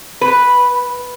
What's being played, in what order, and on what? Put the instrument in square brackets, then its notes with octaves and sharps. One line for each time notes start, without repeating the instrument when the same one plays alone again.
[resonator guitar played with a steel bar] B4